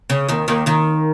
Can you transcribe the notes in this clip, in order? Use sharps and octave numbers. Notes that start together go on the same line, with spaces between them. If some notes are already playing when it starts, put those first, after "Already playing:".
C#3
D#2 D#3
D#2 D#3
D#2 D#3